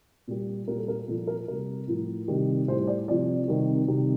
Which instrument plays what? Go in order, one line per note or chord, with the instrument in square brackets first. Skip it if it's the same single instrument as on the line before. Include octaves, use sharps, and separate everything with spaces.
[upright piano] A#2 G3
A#2 G3 A#4
A4
A#4
A#2 F3 A4
A#4
C3 G3 A#4
A2 F3
C3 D#3 G3
A2 C5
G3
D5
C3 F3 D5
C3 D#3 G3
C3 D#3 G3